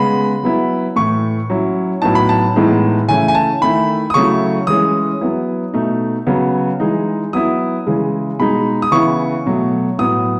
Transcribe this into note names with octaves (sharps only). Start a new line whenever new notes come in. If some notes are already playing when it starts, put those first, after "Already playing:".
Already playing: C#3 G#3 B3 B5
F#3 B3 E4
A2 E3 A3 C#6
F#3 C#4 E4
A2 F#3 B3 D#4 A5
B5
A5
A2 E3 G#3 B3 D#4
C#3 E3 A3 C#4 E4 G#5
G#5
A5
D#3 A3 E4 B5
D#6
C#3 F#3 A3 E4 C#6
E3 G#3 C#4 D#6
F#3 B3 E4
B2 A3 D#4
C#3 F#3 B3
E3 G#3 D#4
F#3 B3 E4 D#6
C#3 E3 G#3
B2 G#3 D#4 B5
D#6
C#3 E3 B3 E4 C#6
B2 F#3 A3
A2 F#3 B3 D#6